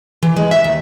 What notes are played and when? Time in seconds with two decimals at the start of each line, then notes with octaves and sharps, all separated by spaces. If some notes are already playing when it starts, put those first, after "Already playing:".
0.23 E3
0.37 G#3
0.51 E5
0.64 D#2